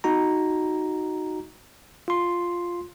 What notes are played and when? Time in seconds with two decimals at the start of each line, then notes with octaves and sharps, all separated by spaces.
0.04 D#4 F#4 A#5
2.08 F4 C6